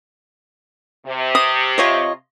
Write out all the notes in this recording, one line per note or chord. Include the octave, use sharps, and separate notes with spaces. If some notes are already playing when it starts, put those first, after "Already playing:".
C3
D#6
F4 C#5 D#5